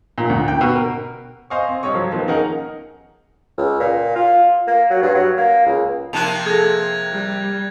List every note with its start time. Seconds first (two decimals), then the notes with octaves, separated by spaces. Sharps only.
0.18 A#2
0.30 D2
0.48 G5
0.61 B2
0.75 A#4
1.50 C5 D#5 F5 G#5 C#6
1.69 C4
1.83 G2 G3 C#5 D#5 C#6
1.94 F3 F#3
2.12 D#3 F3 A#3 B3
2.27 C#4 D#4 G#4 A#4 F#5
3.58 C#2
3.80 A#2
4.16 F4
4.67 A#3
4.90 F#3
5.02 G2
5.15 F#3
5.38 A#3
5.66 C#2
6.13 C3 F3 A#3 A5 F#6 F7
6.46 G#4 A4 G#6 A#6
7.12 G3